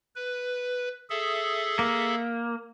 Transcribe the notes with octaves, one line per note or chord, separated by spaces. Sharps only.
B4
G#4 A4 E5
A#3